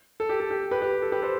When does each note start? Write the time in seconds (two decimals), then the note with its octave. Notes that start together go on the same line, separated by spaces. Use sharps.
0.20 A4
0.29 G4
0.40 A4
0.51 G4
0.71 G4 B4
0.82 G4 B4
1.02 A4
1.12 G4 B4
1.22 A4 C5